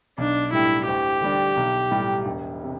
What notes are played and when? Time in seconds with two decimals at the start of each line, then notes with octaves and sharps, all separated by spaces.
0.18 B1 D4
0.53 A2 G3 D4 E4
0.88 D2 G4
1.21 D3 G3 D4
1.57 B1
1.91 A2 G3
2.26 E1
2.64 C3